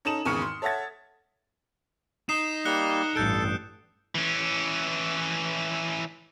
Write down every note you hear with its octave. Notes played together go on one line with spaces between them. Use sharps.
C#4 D#4 A4 D#6 E7 F#7
G#1 E2 C#3 C#6 F6 C#7
C6
A4 C#5 E5 F#5 G#6 A6
D#4 D#6 C7 E7
G3 A#3 F#6 C#7 G7
A1 G2 A4 G6 D7
E3 C#4